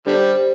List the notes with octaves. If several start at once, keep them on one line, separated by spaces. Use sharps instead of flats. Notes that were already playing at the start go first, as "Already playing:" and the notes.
D3 G3 C5